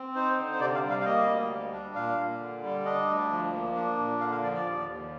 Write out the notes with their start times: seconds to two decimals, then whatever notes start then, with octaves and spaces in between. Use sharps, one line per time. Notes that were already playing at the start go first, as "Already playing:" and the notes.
Already playing: C4
0.15 D#4 C5
0.39 D3
0.52 C5
0.60 C3 D5
0.75 F5
0.83 G3
0.90 F5
1.01 F5
1.05 A#3 D#5
1.28 D2
1.50 G3
1.73 D4
1.95 A#2 F5
2.18 A#2
2.40 D3
2.63 G3
2.85 D4 D#5
3.08 D2
3.30 F3
3.53 A#3
3.75 D4
3.98 A#2
4.20 D3 F5
4.32 F5
4.43 F3 D5
4.54 D5
4.65 D#2
4.88 D#2